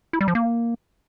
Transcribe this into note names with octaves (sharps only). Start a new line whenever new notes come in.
E4
G3
F3
A#3